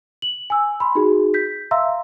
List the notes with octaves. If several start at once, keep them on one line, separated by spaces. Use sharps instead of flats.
F#7
G#5 E6
B5 C6
D#4 F#4 G#4
G6 B6
E5 F5 A#5 C6 E6